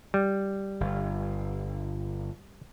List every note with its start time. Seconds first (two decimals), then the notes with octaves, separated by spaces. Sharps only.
0.14 G3
0.81 G1